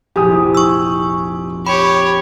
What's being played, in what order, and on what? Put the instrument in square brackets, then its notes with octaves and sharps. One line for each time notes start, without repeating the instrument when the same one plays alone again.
[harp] F1 A#1 E4 [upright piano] G4 G#5 D#6
[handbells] C#6 E6
[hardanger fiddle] G4 C#5 [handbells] B5